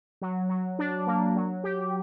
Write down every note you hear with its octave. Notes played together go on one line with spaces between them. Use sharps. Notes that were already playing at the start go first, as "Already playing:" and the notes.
F#3
F#3
D4
A#3
F#3
G4